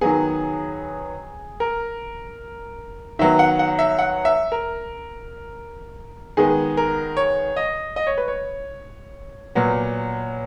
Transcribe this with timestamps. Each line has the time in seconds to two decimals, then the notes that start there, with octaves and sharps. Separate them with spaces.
0.01 D#3 F#3 B3 G#4
1.60 A#4
3.19 D#3 F#3 B3 E5
3.39 F#5
3.59 F#5
3.79 E5
3.99 F#5
4.25 E5
4.52 A#4
6.37 D#3 G#3 B3 G#4
6.77 A#4
7.17 C#5
7.56 D#5
7.96 D#5
8.07 C#5
8.18 B4
8.28 C#5
9.55 A#2 F#3 B3